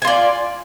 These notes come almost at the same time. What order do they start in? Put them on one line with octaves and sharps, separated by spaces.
G#5 F4 D5